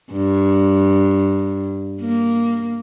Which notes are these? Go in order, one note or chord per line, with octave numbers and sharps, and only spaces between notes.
G2
A#3